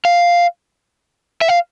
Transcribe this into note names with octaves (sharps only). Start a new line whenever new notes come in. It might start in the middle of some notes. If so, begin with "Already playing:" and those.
F5
E5
F5